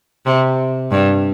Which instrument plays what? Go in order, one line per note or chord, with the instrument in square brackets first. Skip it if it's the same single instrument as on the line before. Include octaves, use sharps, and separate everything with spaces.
[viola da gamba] C3
G2